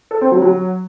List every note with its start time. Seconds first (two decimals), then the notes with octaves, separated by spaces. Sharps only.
0.11 A4
0.21 C4
0.32 F#3
0.42 F#3